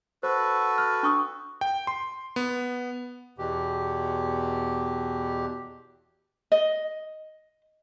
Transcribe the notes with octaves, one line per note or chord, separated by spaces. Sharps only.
F#4 A4 B4 C5
F6
D4 C#6 D#6
G5
C6
B3
E2 B2 G4
D#5